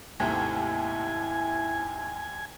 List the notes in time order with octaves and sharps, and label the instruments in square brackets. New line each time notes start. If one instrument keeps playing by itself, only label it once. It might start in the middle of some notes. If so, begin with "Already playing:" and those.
[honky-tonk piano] D#2 [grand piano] G#2 C3 A3 [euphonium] E4 [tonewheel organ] G#5